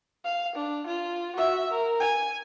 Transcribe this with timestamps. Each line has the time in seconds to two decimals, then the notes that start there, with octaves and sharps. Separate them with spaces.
0.24 F5
0.55 D4
0.87 F4
1.35 F#4 E5
1.70 A#4
2.00 G#5